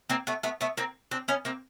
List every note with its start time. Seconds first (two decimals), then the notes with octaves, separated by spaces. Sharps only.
0.09 A#3 C4
0.27 A3 B3
0.43 A3 B3
0.61 A3 B3
0.77 A#3 C4
1.11 C4 D4
1.28 B3 C#4
1.45 A#3 C4